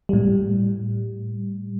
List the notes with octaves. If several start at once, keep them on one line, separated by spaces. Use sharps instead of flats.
A2 G3